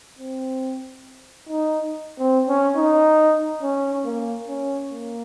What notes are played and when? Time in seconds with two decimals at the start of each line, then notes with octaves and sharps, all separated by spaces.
0.19 C4
1.49 D#4
2.19 C4
2.48 C#4
2.76 D#4
3.62 C#4
4.05 A#3
4.48 C#4
4.90 A#3